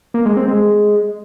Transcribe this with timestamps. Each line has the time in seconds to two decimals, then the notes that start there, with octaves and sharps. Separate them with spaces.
0.14 A#3
0.26 G#3
0.37 C4
0.48 G#3